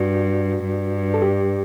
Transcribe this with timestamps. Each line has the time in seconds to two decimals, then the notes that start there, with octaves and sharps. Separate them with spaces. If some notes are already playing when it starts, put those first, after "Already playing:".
Already playing: G2 F#4
0.65 G2
1.14 A4
1.22 G4